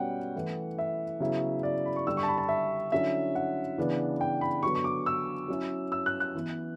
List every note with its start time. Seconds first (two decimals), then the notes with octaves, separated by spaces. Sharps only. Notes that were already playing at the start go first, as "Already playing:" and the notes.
Already playing: B2 G3 C#4 F#5 G5
0.36 E3 A3 E4
0.79 E5
1.20 C#3 F#3 B3 E4
1.63 D5
1.86 B5
1.96 C#6
2.07 D3 G3 D4 E6
2.17 C#6
2.23 A5
2.28 B5
2.38 A5
2.49 E5
2.92 D3 F#3 C#4 E4 E5
3.35 F#5
3.78 C#3 E3 B3 D4
4.21 G5
4.41 B5
4.63 D3 F#3 B3 C#6
4.75 C#6
4.84 D6
5.06 E6
5.48 F#3 C#4 E4
5.92 E6
6.06 F#6
6.20 F#6
6.35 E3 B3 E4